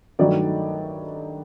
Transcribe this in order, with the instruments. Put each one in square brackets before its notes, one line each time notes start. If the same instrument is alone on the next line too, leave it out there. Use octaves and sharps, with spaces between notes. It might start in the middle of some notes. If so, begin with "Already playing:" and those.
[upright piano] G2 D#3 F#3 A3 D5